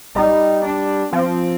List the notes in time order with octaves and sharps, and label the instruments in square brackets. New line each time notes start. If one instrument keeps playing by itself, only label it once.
[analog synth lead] G3 [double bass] D#4
[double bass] D4
[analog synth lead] F3 [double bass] C4